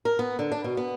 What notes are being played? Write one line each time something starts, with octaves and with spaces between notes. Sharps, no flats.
A#4
B3
D3
D4
B2
B3